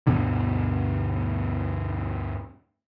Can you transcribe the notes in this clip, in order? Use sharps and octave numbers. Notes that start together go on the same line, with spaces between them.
D2 G2 B2 D3